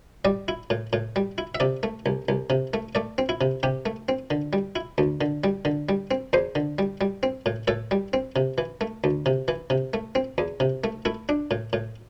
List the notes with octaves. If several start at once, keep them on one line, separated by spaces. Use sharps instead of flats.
G3 D5
E4
A2
A2
G3
E4
E5
C3 D5
A3
C2
C2
C3
A3
A3 D5
C4
E4
C3
C3 G4
A3
C4
D3
G3
E4
D2
D3
G3
D3
G3
C4
E2 C5
D3
G3
G3
C4
A2
A2 A4
G3
C4
C3
E3
A3
D2
C3
E3
C3
A3
C4
E2
C3
A3
A3 E4
D4
A2
A2